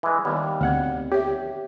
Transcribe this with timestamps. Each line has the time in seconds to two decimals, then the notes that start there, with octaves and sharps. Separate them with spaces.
0.03 E3 G#3
0.25 D#2 D#3 G3 B3
0.61 D2 B3 C4 F#5
1.12 G4 C#5 E5